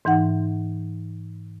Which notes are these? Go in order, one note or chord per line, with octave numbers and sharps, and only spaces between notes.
G#2 E3 D#4 F#5